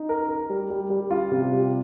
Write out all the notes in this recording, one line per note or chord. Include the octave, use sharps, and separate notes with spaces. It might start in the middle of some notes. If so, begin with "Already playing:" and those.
Already playing: D#4
A#4
A#4
G3
G3
G3
F4
C3
G3